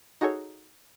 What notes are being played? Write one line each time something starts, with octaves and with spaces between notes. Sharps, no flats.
D#4 F#4 G#4 A4 C#5